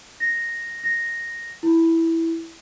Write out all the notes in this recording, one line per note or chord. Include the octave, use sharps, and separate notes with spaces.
A#6
A#6
E4